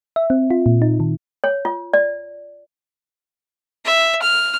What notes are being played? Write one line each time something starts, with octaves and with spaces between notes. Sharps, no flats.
E5
C4
F4
A#2
D#4
D#3
C#5
F4
D5
E5
F6